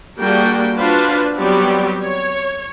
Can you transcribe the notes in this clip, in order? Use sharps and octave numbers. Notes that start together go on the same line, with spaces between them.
G3 A#3 D4 F#4 G#4 G5
D4 F4 F#4 B4 C5 F5
F#3 G3 B3 C4 G4 D5
C#5